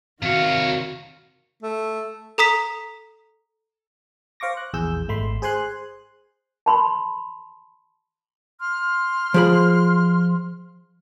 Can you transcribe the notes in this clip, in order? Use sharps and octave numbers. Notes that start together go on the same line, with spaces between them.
C3 D#3 F#4 C#5 F5
A3
A4 A#5 D#6 B6
C5 F5 C#6 D6 A#6
F#6
A#1 E2 G#4 E6 G6
G#1 A3 B5 C6
G#4 C5 G#5 C6 F#6
A5 B5 C6
C6 F6
F3 G#4 B5